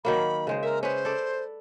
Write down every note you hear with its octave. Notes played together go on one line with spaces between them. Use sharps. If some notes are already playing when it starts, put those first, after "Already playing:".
D#3 F#3 A#3 B5
C#3 G#3 C5
A#4 E5
C#4 G#4 B4 C5
A4 D5